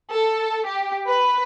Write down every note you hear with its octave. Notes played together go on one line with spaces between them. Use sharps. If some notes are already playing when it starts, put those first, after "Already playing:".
A4
G4
B4